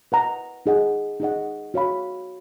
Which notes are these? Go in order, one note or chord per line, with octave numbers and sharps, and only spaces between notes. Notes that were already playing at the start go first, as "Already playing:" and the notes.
B4 F#5 A#5
D#4 G#4 D#5 F#5
D#4 G#4 D#5 F#5
F#4 C#5 F5 B5